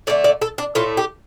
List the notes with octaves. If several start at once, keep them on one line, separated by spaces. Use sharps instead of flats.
D3 A3 D5
D5
A4
D4
A2 A3 F4
G4